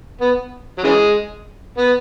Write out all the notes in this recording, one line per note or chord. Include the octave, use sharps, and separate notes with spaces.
B3
F#3
C#3 E3 G#3
B3